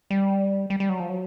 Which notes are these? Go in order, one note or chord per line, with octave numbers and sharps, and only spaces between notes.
G3
G3
G3
F#3
F3
F#3